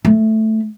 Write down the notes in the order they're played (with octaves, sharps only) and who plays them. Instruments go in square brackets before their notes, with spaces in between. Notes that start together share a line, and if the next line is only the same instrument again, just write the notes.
[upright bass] A3